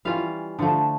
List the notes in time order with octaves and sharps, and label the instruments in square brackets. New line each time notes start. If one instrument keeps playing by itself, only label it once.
[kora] E3 G3 C#4 F4 F5
D3 F3 A3